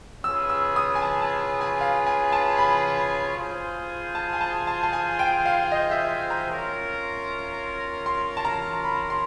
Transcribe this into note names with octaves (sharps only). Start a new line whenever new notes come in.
C#4 F4 G#4 B4 E6
E6
D#6
G#5
A5
A5
G#5
F5
G#5
A5
B5
F4 G#4 C5
A5
G#5
A5
A5
A5
G#5
G5
F5
D#5
E5
A#5
C#4 F4 A#4
C6
A5
A#5
B5
C6